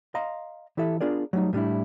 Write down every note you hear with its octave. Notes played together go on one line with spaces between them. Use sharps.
D#5 F5 A#5 C6
E3 E4 G4 A4 E5
B3 D4 F4 G#4 A#4 D5
F#3 G3 A3 D4 D#4
A2 G3 D4 E4